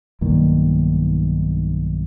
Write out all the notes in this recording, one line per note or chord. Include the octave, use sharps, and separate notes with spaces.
B1 G2 D#3 A#3